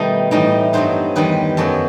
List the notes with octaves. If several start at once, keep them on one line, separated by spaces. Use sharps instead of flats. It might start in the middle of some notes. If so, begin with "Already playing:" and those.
Already playing: B2 D#3 G3 A3 B3 D#4 D#5
A2 E3 G3 D#4 D#5
G2 F#3 B3 D#4 C5
E2 D#3 G3 D#4 B4
F#2 F#3 B3 A4